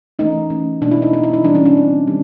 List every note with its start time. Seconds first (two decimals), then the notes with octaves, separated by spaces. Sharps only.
0.19 E3 A3 C#4 D#4
0.50 E3 A3 C#4
0.81 B2 G#3 B3 D4
0.91 E4
1.02 D#4
1.13 B2 G#3 B3 D#4
1.23 E4
1.33 D#4
1.44 E3 G3 C4 D4
1.55 C#4
1.66 D4
1.76 E3 G3 C4
2.07 D#3 G3 C4